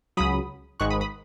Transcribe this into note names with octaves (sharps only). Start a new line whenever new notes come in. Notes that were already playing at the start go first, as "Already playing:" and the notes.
C#2 C#3 F#3 B5 D#6
G#1 G#2 D#3 G#3 C#6 F#6
B5 D#6
B5 D#6